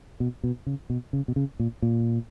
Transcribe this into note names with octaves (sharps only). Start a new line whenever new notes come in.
B2
B2
C#3
B2
C#3
B2
C#3
A#2
A#2